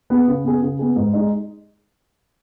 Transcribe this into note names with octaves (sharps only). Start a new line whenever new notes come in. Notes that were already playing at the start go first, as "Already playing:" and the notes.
B3 G#4
C#3
B3 G#4
C#3
B3 G#4
G#2
G#3 D#4